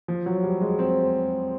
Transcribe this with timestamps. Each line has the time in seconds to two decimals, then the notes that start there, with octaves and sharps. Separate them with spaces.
0.08 F3
0.26 F#3
0.43 G3
0.62 G#3
0.79 C4